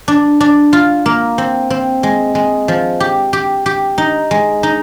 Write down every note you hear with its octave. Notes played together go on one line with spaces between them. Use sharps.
D4
D4
F4
A#3
C4
C4
G#3
G#3
F3
G4
G4
G4
D#4
G#3
D#4